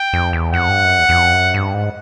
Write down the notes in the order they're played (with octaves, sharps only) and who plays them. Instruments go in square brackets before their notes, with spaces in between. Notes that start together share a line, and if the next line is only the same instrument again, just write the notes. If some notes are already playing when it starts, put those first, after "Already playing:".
Already playing: [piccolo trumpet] G5
[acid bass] F2
E2
[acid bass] F2 [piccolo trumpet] F#5
[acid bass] G2
F#2
E2
E2
F2
F#2
G2
G#2